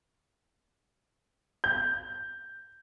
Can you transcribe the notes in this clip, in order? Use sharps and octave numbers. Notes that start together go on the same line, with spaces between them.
G6